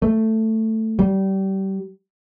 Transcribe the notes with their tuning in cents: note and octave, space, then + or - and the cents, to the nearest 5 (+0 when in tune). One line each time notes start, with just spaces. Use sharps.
A3 +10
G3 -25